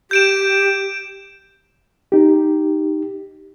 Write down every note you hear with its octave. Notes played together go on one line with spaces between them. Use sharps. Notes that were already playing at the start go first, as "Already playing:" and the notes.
G4 G6 D7 E7
D#4 G4